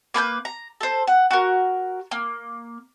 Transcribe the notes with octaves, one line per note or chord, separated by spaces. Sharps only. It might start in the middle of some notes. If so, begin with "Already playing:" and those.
A#3 B4 G#5 G6
A#5
A4 C5
F#5
F#4 A#4
A#3